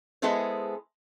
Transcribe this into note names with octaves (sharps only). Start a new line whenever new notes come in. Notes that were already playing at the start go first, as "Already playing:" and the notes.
G#3 B3 E4 G#4 A4 C5